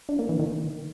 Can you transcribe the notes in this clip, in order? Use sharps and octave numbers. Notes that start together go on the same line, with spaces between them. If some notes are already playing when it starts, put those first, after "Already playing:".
D4
A#3
E3
D#3